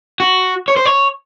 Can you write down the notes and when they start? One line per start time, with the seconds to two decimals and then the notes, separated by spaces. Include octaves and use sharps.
0.20 F#4
0.68 C#5
0.77 C5
0.85 C#5